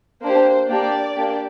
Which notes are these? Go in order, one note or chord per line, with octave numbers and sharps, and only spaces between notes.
A#3 D4 G4 C5
A#3 D4 G4 D5
A#3 D4 G4